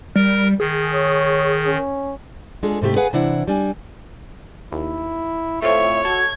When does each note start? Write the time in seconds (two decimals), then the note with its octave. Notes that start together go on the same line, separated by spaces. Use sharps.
0.16 G3 A#4
0.60 D#3 G#4
0.94 C#5
1.66 C#4
2.63 G#3 D4 F4 G#4 A4
2.82 G#2 C3 A3 G4
2.96 G#4 B4 F5 F#5 G#5
3.13 C3 E3 D4 E4 F#5
3.48 G3 D4 G#5
4.72 D#2 E4
5.62 A2 A3 C4 F4 C#5 E5
6.05 F#4 A4 G#6